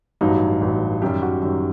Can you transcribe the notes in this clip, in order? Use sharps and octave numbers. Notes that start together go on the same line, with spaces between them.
A1 G2 F#3 D#4
A1 G2 F#3
F#2 D#3 G3 G4
F#4
F#2 D#3 G3